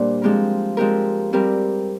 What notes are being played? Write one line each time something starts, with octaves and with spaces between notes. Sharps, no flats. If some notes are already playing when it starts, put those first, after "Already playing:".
Already playing: A#2 G3 D4 C5
F3 G#3 C4 G4 A#4
F3 G#3 C4 G4 A#4
G3 C4 G4 A#4